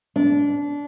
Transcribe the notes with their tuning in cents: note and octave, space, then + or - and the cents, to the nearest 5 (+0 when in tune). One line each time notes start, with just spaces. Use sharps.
D4 -25